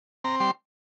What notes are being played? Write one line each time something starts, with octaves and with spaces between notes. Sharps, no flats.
C4 A#5
G3 C6